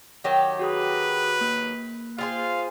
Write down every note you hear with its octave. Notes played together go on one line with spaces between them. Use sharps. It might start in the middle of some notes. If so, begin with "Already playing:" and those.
D#3 F#3 G4
F#4 G#4 B4 D#6
A#3
F4 G#4 C5 F5